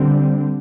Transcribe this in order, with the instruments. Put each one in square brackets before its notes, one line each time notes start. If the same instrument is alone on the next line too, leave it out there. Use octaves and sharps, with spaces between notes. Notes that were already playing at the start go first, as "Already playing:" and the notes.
Already playing: [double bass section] D3 G3 C4